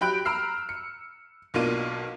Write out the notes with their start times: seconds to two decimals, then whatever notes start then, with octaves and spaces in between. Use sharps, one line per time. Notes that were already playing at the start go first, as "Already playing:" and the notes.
0.01 F#3 G4 G5 B5 F#6 D7
0.25 A#5 B5 E6 F6 C7
0.69 C#7
1.54 B1 B2 A#3 D4 F4 D#7